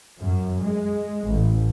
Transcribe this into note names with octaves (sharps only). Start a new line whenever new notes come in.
F#2
G#3
A1